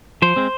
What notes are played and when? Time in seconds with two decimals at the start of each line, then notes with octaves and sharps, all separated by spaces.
0.22 F3 C5
0.36 G#3 C4